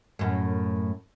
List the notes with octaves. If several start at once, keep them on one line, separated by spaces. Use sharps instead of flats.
F#2 A2